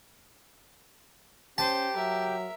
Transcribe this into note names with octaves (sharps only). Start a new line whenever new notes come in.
C#4 G4 C5 A5
F#3 A#4 E5